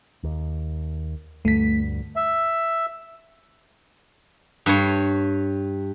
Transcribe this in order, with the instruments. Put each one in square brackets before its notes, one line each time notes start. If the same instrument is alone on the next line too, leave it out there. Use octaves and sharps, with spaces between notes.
[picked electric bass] D#2
[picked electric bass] D2 G2 [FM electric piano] A3 B6
[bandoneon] E5
[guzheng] G2 C#5